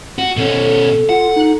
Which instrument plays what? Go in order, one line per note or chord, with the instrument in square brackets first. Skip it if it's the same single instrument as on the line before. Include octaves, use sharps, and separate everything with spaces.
[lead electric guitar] F#4
[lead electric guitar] B2 C#4 [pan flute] A4
[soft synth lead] F4 [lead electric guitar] F#5
[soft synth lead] D#4